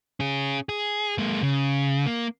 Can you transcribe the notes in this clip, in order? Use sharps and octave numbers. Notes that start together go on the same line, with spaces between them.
C#4 G#4
G#4
G#3 A#3
C#3
A#3